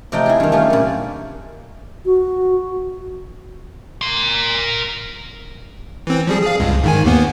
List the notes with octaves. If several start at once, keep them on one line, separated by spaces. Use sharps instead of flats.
C3 F3 A3 D#4 D5 G5
E4 G#4
G2 D#3
A3 C#4 F4 G4 G#4
F#2 A#2
F#4
A#4 C6
E3 C4
F3 G3 G#4
G#4 F5
C#2 G2
G#2 D#3 G#5
D#2 A#3 B3